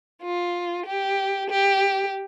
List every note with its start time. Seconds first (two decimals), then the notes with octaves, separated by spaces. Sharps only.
0.22 F4
0.86 G4
1.50 G4